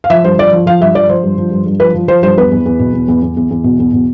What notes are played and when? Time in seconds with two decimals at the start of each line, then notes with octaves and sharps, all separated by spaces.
0.04 F5
0.10 F3 E5
0.24 G2 C5
0.38 F3 D5
0.53 F3
0.66 F3 F5
0.81 G2 E5
0.95 F3 D5
1.09 F3 C5
1.23 G2
1.38 F3
1.51 G2
1.66 G2
1.80 F3 B4
1.95 F3
2.08 F3 C5
2.23 G2 C5
2.38 E2 B4
2.51 E2
2.66 E2
2.79 B2
2.93 E2
3.08 E2
3.23 E2
3.37 E2
3.51 E2
3.64 B2
3.79 E2
3.93 B2